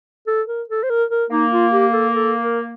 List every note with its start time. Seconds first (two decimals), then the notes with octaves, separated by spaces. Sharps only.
0.27 A4
0.48 A#4
0.69 A4
0.83 C5
0.90 A#4
1.11 A#4
1.30 A#3 D#4
1.52 F4
1.72 G4
1.93 A4
2.14 A4
2.41 A#4